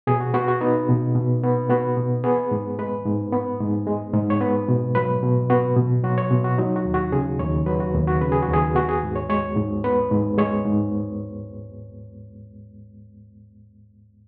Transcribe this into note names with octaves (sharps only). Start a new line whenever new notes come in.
B2 G#4
F#4
B3 F#4
F#4
B3 D#4
B2
B2
B3
B3 F#4
B2
B3 G#4
G#2
G#3 B4
G#2
B3
G#2
G#3
G#2
C#5
B3 B4
B2
F#3 B4
B2
B3 F#4
B2
F#3 F#4
C#5
B2
F#4
F#3 D#4
F#4
D#2
F#4
C#3 G#4
D#2 C#5
F#3 B4
F#4
D#2
F#4
C#3 B4
G#4
F#4
D#2
G#4
B3 F#4
G#4
G#2
C#5
G#3 C#5
G#2
B3 B4
G#2
G#3 C#5
G#2